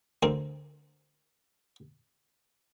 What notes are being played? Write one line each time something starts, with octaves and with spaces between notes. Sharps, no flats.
D2 C4 A#4